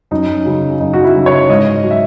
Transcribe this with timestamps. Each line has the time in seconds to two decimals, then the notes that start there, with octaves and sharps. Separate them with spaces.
0.11 F#2 D#4
0.45 C#3 F#3
0.80 F#2 D#4
0.94 F#4
1.04 E4
1.15 C#3 F#3
1.26 C#5
1.49 G#2 D#5
1.84 F#3
1.91 E5